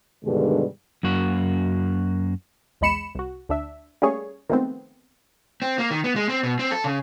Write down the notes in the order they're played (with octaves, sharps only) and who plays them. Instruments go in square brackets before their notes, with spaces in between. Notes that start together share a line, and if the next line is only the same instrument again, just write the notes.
[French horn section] G2 B2 D3 D#3 G3 G#3
[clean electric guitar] F#2 A#3 F#4
[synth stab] B1 E2 G#3 B5 C#7 E7
C2 F#4
D2 D4 E5
G3 A3 A#3 C#4 G#4 C#5
D#3 F3 G#3 A3 B3 C4
[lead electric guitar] C4
A#3
D#3
B3
G#3
C4
B2
C4
A4
C#3